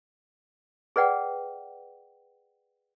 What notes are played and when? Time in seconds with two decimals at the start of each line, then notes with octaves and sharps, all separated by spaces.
0.96 G#4 B4 D5 F#5 G5